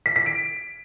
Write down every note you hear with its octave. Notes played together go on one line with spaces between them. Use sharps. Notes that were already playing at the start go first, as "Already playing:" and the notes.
B6
B6
D7